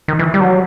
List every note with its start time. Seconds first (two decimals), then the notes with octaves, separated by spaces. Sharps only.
0.08 D#3
0.19 E3
0.34 G3
0.40 F#3